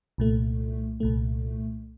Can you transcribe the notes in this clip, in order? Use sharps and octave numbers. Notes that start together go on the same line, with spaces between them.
C2 A#2 A3
C2 A#2 A3